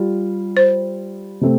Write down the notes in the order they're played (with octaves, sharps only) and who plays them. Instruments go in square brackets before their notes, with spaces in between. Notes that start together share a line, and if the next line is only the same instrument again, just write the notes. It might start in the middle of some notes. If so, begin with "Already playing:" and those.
Already playing: [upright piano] G3 F4
[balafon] C5
[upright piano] C3 A3 C4